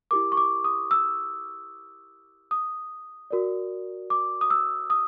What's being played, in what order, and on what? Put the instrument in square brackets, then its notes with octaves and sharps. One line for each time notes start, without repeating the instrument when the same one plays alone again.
[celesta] E4 G4 A#4 D6
C#6
D6
D#6
E6
D#6
F#4 A#4 D5
D6
D#6
E6
D#6